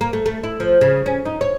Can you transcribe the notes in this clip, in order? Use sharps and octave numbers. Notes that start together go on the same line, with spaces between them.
A#3
A3
A3
E4
F3
C#3
C#4
D#4
C#5